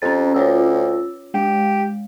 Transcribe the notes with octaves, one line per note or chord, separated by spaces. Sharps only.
F2 C#4 A6
D2 F4 C#5 E6
G#3 G4